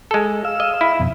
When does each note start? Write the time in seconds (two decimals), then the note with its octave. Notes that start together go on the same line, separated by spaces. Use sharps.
0.11 G#3 A4
0.45 F5 E6
0.60 D#5
0.81 E4
0.99 F2 B2